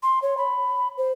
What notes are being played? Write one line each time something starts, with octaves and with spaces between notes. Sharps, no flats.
C6
C#5
B5
C5